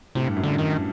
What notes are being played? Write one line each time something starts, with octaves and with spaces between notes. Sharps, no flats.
A2 C3
G2
F#2
G2 D3
D#3